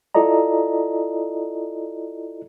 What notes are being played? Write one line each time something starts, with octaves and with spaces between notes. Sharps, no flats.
E4 F4 A4 D5 D#5 A#5